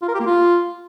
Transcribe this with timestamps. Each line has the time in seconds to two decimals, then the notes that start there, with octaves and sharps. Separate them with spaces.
0.02 F4
0.08 A#4
0.14 G4
0.20 A#3
0.26 F4